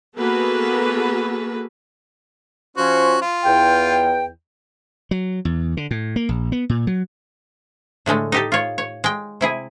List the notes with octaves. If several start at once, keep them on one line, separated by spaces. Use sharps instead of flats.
A#3 B3 F#4 G#4 A4 B4
F3 C#4 F#4 C5
F4
E2 G5
F#3
E2
D3
A2
A#3
A#1
B3
A#2
F#3
A2 D3 G#3 A3
D#4 G4 A4
F4 C#5
C#5
G#3 G5
C3 E4 G#4